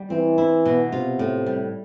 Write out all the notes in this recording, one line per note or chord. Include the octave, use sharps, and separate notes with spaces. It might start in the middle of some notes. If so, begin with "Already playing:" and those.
Already playing: G3
E3 C4
E4
B2
C3 F4
A2
G3